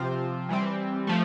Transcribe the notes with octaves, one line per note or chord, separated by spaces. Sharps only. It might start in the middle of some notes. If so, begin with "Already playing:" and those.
Already playing: C3 F3 C4 F4 C5
E3 G3 C4
F3 A3